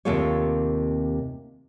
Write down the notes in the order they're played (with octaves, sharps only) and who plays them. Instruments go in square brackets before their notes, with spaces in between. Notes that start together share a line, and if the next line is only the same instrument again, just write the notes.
[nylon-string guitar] D#2 C3 A#3 F4 A4 C#5